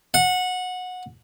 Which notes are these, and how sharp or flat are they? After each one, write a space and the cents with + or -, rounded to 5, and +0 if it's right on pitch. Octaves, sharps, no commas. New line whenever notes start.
F#5 -20